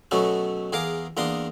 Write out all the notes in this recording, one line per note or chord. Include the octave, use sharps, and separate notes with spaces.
B2 F#3 A3 B3 C#4
E2 G#4 A#4 F5 D6
E2 A#3 D4 A#4 C6 D#6